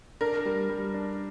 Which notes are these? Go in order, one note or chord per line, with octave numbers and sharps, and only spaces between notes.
D4 A#4
G3
G3
D4